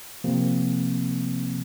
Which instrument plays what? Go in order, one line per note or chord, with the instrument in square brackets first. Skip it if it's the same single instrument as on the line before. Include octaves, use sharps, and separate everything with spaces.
[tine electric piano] C3 F3 A#3 C4